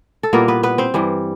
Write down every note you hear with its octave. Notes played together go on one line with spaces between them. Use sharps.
A4
A#2 G3 A#3 B3 E4 A#4
B3 B4
B3 B4
C4 C5
G2 E3 G3